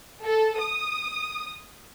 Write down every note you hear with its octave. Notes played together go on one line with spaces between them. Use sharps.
A4
D#6